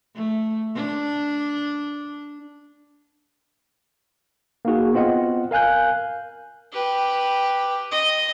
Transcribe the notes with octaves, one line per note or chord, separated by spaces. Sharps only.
A3
D4
A#3 D#4 F#4 G#4
B3 C4 F4 D#5 F#5
A#4 F5 G#5 F#6 G6
G4 B4
D#5